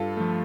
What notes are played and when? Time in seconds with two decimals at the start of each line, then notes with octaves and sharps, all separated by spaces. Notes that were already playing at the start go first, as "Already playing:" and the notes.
Already playing: G2 F4 A4
0.17 F3 A3